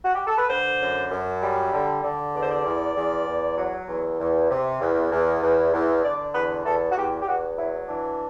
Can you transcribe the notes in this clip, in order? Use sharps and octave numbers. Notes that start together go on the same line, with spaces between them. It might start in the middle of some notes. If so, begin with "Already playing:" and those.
F#4
G4
A4
B4
D3 C5
F#2
F#2
G3
D3
D3
E2 D5
C5
D5
E2
E2
E2
F#3
E2
E2
C3
E2
E2
E2
E2
D3 D5
E2 B4
E2 A4
F#4
E2 G4
G4
E2 F#4
F#3 E4
E3 D4